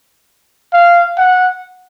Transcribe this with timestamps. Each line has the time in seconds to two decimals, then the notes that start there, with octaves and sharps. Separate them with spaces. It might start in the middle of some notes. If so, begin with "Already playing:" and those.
0.73 F5
1.18 F#5